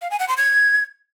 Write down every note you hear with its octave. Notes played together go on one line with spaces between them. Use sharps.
F5
G#5
F#5
C6
G#6